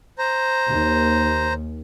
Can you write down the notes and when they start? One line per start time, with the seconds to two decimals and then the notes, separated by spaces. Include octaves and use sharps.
0.18 C5 A#5
0.68 D#2